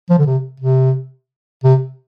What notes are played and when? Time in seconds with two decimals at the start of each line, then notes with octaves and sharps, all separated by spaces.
0.10 F3
0.19 D3
0.26 C3
0.60 C3
1.64 C3